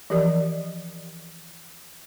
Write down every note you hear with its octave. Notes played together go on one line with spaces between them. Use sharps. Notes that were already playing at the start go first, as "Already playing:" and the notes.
E3 F3 G4 A#4 D5 D#5